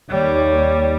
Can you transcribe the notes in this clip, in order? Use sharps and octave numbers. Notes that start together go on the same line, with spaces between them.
D#2 G3 C#5